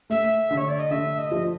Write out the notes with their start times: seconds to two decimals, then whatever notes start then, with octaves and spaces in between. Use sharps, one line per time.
0.10 A3 E5
0.51 D3
0.57 C#5
0.68 D5
0.79 D#5
0.91 D3 E5
1.18 D#5
1.31 F3